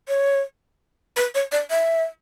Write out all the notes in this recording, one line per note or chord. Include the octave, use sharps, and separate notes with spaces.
C#5
B4
C#5
D5
E5